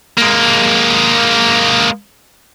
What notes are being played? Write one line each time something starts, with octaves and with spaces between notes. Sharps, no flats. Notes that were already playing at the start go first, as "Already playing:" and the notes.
G#3 A#3